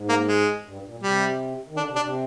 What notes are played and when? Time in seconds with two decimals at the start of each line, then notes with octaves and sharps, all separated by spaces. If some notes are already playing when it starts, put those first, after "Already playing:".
Already playing: G#2
0.09 A#3
0.28 G#3
0.65 G2
0.83 A#2
1.02 C3 G3
1.69 D#3
1.77 D3 D4
1.89 C3
1.96 D4
2.01 C3